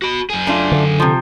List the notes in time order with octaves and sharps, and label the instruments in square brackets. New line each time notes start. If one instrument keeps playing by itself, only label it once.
[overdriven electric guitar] F#4 B5
F#2 G#4
[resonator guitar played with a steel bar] A3 D4 F4
[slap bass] D3
[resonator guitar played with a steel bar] C3 F3